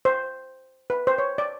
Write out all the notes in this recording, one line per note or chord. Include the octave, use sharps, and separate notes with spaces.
C5
B4
C5
C#5
D5